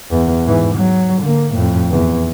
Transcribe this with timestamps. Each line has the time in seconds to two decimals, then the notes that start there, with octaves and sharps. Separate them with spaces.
0.11 E2
0.46 G#2 E3
0.76 F#3
1.22 D3 A#3
1.53 F2 A2
1.91 E2